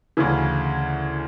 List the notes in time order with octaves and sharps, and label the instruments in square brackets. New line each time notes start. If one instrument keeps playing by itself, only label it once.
[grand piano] D2 C#3 E3